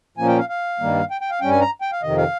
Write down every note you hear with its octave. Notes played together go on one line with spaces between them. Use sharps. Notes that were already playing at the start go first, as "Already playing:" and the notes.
A#2 F3 A#3 C#4 G#5
G5
F5
F5
G2 D#3 G3 A#3
G5
G5
F5
G2 G3 C#4 G5
G#5
A#5
G5
F5
F2 C3 D#3 D#5
F5